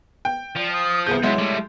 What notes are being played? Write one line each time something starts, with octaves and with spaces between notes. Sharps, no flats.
G5
F3 D5
D#6
C2 B3 G#4 G6
F#2 G#3 B3 E4 C#5
G3 A3